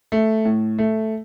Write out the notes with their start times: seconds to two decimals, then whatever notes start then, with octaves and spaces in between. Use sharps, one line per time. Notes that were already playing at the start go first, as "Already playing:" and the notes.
0.12 A3
0.45 A2
0.78 A3